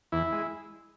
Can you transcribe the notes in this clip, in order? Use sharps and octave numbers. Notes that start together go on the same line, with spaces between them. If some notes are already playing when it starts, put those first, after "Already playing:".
E2 E4
G#3